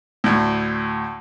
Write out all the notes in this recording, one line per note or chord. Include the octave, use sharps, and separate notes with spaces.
D2 A2